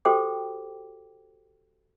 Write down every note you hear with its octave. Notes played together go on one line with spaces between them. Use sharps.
F#4 G4 A4 C5 G5 D6